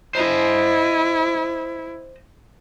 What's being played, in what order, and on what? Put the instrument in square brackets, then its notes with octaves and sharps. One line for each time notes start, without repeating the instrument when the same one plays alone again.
[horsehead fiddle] E4 [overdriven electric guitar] C5 D#5